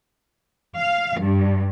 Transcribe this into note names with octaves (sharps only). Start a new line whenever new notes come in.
F5
G2